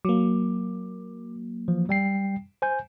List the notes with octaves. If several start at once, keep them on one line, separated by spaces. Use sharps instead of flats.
F#3 A#3 D6
E3 F3
G3 G5 C7
C5 G#5 G6